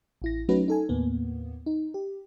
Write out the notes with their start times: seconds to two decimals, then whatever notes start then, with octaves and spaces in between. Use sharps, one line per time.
0.22 A1 E4 A#6
0.49 F#3 A3 C#4 D#4 F#4 B4
0.68 D#4 A4 G#5
0.89 D#2 A2 A#3 B3
1.66 D#4
1.94 G4